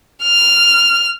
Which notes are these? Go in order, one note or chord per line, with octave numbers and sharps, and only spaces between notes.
F6